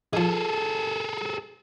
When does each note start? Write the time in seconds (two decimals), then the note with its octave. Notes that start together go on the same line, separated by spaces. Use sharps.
0.13 D#3 F3 G#4 A4